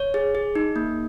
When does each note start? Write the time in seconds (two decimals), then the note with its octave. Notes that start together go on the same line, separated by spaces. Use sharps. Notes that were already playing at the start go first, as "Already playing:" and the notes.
Already playing: C#5
0.14 G#4
0.35 G#4
0.56 D#4
0.76 A#3